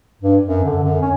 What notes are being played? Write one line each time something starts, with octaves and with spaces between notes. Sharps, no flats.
G2
F#2
D3
F#2
C#4